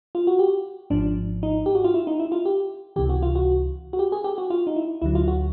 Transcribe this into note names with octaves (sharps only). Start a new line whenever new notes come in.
F4
F#4
G4
G#1 G#2 F3 D4
D#4
G4
F#4
F4
E4
D#4
E4
F4
G4
C#2 C3 E3 G4
F#4
F4
F#4
F#4
G4
G#4
G4
F#4
F4
D#4
E4
D2 D3 F#3 E4
F4
F#4